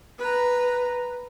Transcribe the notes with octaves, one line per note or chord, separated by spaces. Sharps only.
B4 A#5